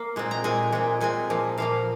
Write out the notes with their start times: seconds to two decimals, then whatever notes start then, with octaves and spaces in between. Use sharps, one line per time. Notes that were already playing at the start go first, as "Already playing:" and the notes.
Already playing: A#3
0.16 A#2 G#3 C4
0.31 A#5
0.44 A#2 G#3 C4 G#5
0.72 A#2 G#3 C4
1.00 A#2 G#3 C4 G#5
1.30 A#2 F3 A#3
1.58 A#2 F3 A#3 F5